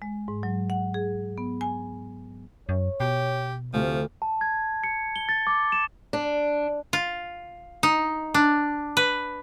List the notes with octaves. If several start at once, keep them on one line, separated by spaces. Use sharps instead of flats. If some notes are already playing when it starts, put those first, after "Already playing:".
G#3
G#2
F#3
F#5
G#4
B3
G#5
F#2 C#5
B2 G4
D2 C3 F3
A5
G#6
C#7
G7
A6
D6
E7
D4
F4
D#4
D4
B4